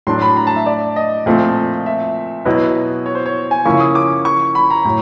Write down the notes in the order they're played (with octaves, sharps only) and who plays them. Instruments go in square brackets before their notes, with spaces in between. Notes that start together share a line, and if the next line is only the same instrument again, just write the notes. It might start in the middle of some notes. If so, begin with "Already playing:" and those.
[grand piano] A2 F#3 A3 D4 [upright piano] C6
[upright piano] B5
A#5
A5
E5
D5
D#5
[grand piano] A#2 F3 A3 C4
[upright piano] E5
[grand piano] B2 F#3 B3 E4 [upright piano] D#5
[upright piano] C#5
C5
C#5
G#5
[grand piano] C#3 F3 A#3 C#4 E4 [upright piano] C#6
[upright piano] D#6
D6
C#6
B5
A#5
[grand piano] A2 F#3